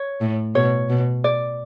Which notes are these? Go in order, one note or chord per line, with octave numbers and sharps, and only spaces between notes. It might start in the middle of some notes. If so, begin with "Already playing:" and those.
Already playing: C#5
A2
B2 C#5
B2
D5